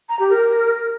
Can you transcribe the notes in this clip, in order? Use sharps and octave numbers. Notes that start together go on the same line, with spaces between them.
A#5
G4
A#4